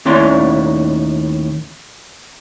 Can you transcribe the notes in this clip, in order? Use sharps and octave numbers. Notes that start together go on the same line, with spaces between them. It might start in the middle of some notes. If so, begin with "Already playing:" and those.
D#2 A2 C#4 E4 D5 C6